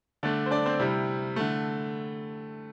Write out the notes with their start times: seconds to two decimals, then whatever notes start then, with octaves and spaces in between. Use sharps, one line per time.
0.23 D3 A3 D4 D5
0.46 C5
0.51 D4 D5
0.66 C4 C5
0.80 C3 G3 E4
1.36 D3 A3